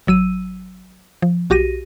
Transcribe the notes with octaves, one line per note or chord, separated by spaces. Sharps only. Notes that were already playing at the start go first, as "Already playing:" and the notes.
G#1 F#3 E6 D#7
F3
B1 F#4 G4 A#6 D#7